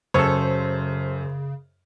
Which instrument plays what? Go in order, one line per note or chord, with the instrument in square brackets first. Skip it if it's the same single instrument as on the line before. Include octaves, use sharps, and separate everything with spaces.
[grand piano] F#2 [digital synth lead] C#3 [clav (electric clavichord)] A4 C#5 [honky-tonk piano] C5